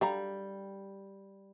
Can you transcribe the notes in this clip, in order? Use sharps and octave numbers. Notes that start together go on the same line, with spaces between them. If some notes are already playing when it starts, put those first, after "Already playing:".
D3 G3 F5 A#5